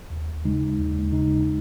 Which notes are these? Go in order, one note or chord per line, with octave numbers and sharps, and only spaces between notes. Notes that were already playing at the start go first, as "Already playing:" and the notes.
D#2
C#3 G#3 D#4
D#2
C#3 G#3 D#4